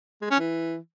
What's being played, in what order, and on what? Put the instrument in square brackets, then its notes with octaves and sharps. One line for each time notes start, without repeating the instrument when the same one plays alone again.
[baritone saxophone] G#3
C#4
E3